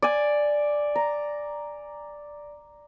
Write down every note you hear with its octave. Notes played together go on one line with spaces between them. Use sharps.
D5 G#5
A#5